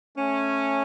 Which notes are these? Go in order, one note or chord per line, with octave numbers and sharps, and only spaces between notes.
A3 C#4